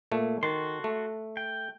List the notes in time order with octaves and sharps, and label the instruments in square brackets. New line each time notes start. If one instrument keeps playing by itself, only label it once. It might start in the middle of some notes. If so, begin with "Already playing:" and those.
[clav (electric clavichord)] A#2 A3
[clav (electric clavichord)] D#3 [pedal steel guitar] F#4 A4 C6
[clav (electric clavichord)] A3
[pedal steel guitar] G5